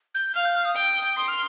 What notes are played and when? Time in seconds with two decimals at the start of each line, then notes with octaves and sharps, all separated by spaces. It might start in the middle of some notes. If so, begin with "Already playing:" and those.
0.15 G6
0.35 F5 F6
0.45 G6
0.55 F6
0.65 D#6
0.76 G5
1.17 C6 D#6
1.28 F6